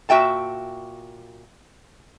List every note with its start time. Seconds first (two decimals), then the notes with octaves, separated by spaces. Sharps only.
0.09 A#2 F#4 E5 G5 A5